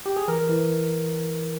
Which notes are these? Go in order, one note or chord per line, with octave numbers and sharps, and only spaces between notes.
G4
G#4
E3 A#4
E3